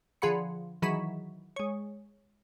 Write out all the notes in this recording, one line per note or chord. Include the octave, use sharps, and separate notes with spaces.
D3 F3 G#4 F#5 B5 C#7
D#3 E3 F#3 G#4 B6 E7
G#3 C#5